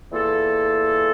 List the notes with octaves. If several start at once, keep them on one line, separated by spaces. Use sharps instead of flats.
E2 E3 A#3 F4 A4